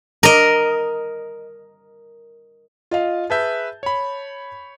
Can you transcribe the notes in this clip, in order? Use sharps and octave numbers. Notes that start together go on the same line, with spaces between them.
A#4 D#5
F4 D#5 F5
G#4 B4 E5 A5 G6
C#5 B5